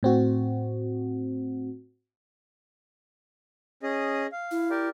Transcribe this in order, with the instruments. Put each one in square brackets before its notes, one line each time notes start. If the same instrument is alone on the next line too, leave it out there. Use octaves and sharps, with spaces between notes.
[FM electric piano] A2 C4 F#4
[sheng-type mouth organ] C#4 G#4 D#5
F5
[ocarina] E4
[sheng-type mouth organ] G4 A#4 D5